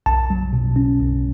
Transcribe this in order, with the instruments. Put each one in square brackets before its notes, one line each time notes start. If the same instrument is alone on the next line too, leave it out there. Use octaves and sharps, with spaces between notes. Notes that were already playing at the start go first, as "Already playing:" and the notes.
[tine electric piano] B1 A5
F#3
B2
C#4
B1